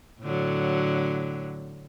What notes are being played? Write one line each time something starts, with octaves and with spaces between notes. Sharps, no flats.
A2 D3 F#3